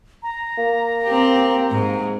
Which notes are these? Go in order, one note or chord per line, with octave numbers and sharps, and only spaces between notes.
A#5
A#3
C4 G4
G#2